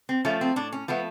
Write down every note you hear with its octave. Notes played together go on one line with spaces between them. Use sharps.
C4
F3 A3 C#4
C4
A2 D4
C#4
F3 A3 B3